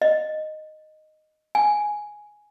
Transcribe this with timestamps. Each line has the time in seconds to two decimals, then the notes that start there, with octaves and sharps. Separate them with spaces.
0.02 D#5
1.55 G#5